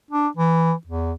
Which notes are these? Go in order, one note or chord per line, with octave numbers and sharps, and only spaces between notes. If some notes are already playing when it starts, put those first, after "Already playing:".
D4
E3
E2